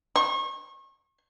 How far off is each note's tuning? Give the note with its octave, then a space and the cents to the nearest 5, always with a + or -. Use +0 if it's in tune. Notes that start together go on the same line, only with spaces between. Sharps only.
C#6 -35